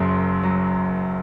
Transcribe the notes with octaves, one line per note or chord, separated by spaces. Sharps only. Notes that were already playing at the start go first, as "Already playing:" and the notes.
Already playing: F#1 F#2 F#3 C6
F#3